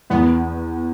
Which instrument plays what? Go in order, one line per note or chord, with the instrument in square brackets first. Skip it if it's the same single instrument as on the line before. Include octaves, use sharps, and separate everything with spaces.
[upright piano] E2 [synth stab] B3